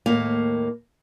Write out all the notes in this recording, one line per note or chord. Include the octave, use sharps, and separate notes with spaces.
D#2 A2 A#3 F5